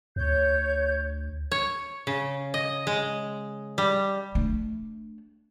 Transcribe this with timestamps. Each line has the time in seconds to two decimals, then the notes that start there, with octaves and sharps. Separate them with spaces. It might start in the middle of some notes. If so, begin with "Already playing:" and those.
0.16 D2 C#5 G6
1.52 C#5
2.07 C#3
2.54 D#5
2.87 G#3
3.78 G3
4.35 A3 D4